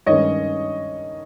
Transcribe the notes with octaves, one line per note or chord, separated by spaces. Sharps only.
G2 D#3 G#3 C#4 C#5 D#5